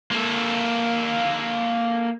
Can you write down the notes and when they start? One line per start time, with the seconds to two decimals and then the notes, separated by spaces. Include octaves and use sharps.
0.12 A#3 A4